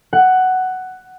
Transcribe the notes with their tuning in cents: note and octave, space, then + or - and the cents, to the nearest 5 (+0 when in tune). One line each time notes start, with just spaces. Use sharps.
F#5 +10